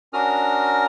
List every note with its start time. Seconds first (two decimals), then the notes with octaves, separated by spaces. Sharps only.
0.13 C#4 D4 F#4 A#4 D#6 F6